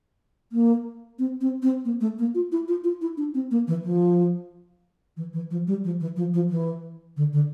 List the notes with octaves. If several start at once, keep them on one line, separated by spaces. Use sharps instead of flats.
A#3
C4
C4
C4
A#3
A3
A#3
F4
E4
F4
F4
E4
D4
C4
A#3
E3
F3
E3
E3
F3
G3
F3
E3
F3
F3
E3
D3
D3